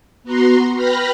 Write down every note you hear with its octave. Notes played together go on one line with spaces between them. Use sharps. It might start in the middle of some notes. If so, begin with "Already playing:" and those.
B3 F#4 A#5 C6
B4 G5 B5 F6 A#6